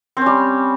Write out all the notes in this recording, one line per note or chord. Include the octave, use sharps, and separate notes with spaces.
G3 C4 C#4